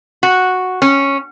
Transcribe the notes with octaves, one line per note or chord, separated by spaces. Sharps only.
F#4
C#4